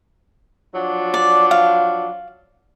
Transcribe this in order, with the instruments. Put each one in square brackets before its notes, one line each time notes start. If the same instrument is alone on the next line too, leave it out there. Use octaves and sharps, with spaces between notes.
[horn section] F3 F#3 D4
[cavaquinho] D5
F5